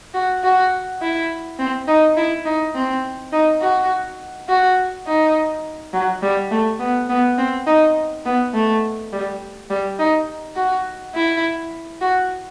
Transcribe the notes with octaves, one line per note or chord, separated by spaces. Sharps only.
F#4
F#4
E4
C4
D#4
E4
D#4
C4
D#4
F#4
F#4
D#4
F#3
G3
A3
B3
B3
C4
D#4
B3
A3
G3
G3
D#4
F#4
E4
F#4